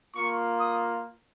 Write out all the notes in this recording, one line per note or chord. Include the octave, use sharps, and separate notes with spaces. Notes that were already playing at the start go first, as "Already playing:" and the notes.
A#3 F4 C#6
D#6